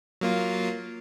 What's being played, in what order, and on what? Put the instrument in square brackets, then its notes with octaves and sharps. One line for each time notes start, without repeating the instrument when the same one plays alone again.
[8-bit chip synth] F#3 A#3 F4